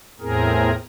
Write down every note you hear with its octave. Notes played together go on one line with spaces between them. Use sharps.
E2 A2 C4 G#4 A#4